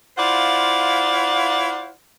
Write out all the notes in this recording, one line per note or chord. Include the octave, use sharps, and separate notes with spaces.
E4 F4 C5 D5 F5 F#5